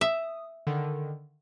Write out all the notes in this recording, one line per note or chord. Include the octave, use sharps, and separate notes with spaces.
E5 D#6
D3 D#3